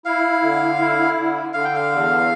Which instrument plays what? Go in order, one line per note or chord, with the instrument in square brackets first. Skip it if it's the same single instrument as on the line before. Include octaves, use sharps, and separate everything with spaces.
[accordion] E4 [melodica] F5
[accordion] D3
E4
D3
[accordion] D3 [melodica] F5
[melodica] G5
F5
[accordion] E2